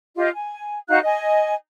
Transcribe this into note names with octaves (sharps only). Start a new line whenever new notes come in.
F4 G4 D#5
G#5
D#4 F#4 F5 F#6
D#5 G#5